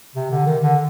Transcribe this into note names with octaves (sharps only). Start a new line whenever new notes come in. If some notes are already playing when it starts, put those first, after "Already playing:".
C3
D3
D#3
D3